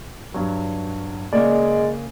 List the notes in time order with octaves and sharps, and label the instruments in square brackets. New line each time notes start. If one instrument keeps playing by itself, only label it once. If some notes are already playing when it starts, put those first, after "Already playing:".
[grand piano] G2 F#3
[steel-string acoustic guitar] C#3 A#3 [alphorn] G#3 [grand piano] D5